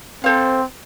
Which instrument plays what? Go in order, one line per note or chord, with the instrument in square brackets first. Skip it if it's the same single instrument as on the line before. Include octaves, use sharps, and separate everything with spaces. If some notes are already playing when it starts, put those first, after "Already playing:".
[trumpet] C4 [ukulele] A4 C5 F5